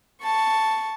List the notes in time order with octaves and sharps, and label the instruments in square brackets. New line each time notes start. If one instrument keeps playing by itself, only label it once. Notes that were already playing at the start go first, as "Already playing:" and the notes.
[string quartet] A5 C#6